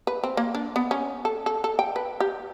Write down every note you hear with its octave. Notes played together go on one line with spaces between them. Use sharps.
B4
C4
A#3
D4
B3
C#4
A4
A4
A4
G5
B4
G4